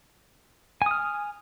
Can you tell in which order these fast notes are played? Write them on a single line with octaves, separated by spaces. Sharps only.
G#5 D#6 F6